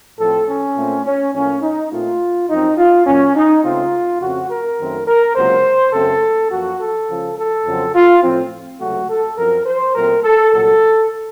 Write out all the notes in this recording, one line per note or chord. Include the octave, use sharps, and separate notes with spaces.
A2 F3 C4 A4
C#4
A#2 A3 C4
C#4
A2 F3 A#3 C#4
D#4
A#2 A3 C4 F4
F#2 F3 C4 D#4
F4
A#2 F#3 A#3 C#4
D#4
C#2 C#3 A3 C4 F4
F2 C#3 A3 C4 F#4
A#4
F#2 D#3 A3 C4
A#4
C#2 C3 F#3 A#3 C5
F#2 C#3 A3 C4 A4
F#2 F3 A#3 F#4
A4
C#2 C#3 F3
A4
F2 C#3 F#3 C4
F4
A2 F3 C4
C#2 C3 F#3 A3 F#4
A4
F#2 F3 C4 A#4
C5
A#2 F#3 A3 C4 A#4
A4
C2 A#2 F#3 A4